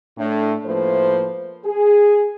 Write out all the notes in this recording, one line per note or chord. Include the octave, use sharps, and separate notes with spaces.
A2 A3 D4
A2 F3 A#3 B4 C5
G#4